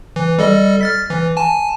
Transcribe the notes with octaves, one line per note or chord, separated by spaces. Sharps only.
E3
G3 A4 D#5
F6 A6 B6
E3
G#5 A5